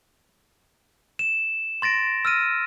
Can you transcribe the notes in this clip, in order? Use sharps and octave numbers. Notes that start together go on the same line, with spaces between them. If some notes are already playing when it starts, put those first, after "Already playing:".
E7
C6 A6 A#6 D7
E6 F6 A#6 D#7